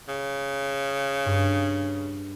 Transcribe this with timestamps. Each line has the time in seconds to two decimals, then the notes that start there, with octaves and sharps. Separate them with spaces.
0.08 C#3
1.26 G2